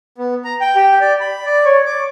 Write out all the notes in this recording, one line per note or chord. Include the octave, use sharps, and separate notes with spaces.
B3
A#5
G5
G4
D5
B5
D5
C#5
D6